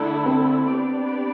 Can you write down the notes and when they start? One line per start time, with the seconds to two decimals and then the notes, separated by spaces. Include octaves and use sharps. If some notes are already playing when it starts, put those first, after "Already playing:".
Already playing: D3 A3 D4 E4 A4
0.26 C4
0.72 B3 D4 G4 D5